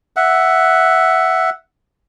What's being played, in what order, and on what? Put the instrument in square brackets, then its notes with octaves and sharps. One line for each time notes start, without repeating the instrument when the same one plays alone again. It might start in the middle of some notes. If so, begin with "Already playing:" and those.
[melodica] E5 F#5